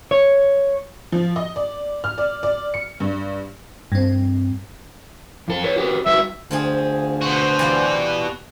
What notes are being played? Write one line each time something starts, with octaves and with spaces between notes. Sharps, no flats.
C#5
F3
D#5
D5
F6
D5
D5
C#7
G2
G2 C4
F2 A4
A4 B4 C#5
F#4 G4 B4
G3 F#4 B4 E5
D2 F3 C4 G#4
B2 F#4 C5
E3 G3 F4